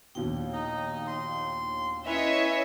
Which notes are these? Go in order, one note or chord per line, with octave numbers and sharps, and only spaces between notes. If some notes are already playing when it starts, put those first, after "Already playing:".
A#1 D#2 B2 G5
D#4 D#5
C6
C#4 E4 B4 C#5 D#5 E5 G#5